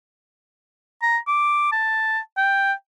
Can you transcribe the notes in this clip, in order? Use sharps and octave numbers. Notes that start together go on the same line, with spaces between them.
A#5
D6
A5
G5